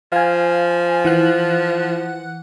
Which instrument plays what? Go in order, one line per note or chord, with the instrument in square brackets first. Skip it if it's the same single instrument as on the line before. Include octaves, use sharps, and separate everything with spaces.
[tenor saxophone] F3 [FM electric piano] F5 G#5
[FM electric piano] E3 F#5 F#6